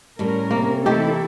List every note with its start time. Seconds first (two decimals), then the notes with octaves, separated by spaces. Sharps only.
0.19 A2 G3 C#4 A#4
0.51 C3 A#3
0.86 E3 A3 C4 D#4 E4 G4 A4